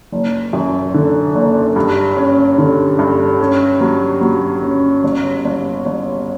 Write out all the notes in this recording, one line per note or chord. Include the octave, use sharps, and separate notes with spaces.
F#1
F#2
D3
F#1
G2
C#4
D3
G2
C#4
F#3
F#3
C#4
G1
G1
G1